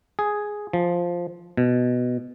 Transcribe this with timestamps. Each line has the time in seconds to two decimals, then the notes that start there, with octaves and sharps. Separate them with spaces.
0.19 G#4
0.73 F3
1.57 B2